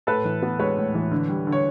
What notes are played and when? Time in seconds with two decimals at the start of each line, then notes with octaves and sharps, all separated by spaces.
0.07 A2 A4 B4
0.24 E3
0.42 B3
0.59 G#3 B4 C#5
0.77 A2
0.94 E3
1.11 D3
1.28 G3
1.47 D3
1.52 C#5